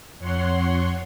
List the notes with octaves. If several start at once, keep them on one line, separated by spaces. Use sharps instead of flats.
F2 C#5 F#5 C6